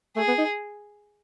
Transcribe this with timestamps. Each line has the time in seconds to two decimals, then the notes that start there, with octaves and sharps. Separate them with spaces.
0.16 A3 G#4
0.28 B3
0.38 D#4